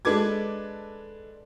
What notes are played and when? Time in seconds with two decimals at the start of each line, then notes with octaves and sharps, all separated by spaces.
0.05 G#3 D4 A4 B4 D6 G#6